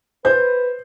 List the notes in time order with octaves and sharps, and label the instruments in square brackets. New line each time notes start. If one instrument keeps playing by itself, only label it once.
[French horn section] B4 [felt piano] C5 G6